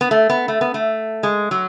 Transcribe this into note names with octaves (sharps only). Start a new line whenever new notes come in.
B3
A3
B3
A3
B3
A3
G#3
F#3